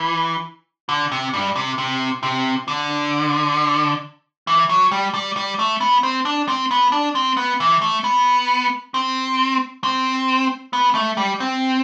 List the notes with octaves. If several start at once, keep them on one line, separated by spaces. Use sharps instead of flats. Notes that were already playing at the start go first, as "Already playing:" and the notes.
Already playing: E3
D3
C3
G2
C3
C3
C3
D3
E3
F#3
G3
G3
G3
A3
B3
C4
D4
C4
B3
D4
C4
B3
E3
A3
B3
C4
C4
B3
A3
G3
C4